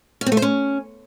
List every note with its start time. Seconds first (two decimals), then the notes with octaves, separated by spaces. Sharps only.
0.21 C#4
0.26 C4
0.32 A3
0.37 C5
0.42 C#4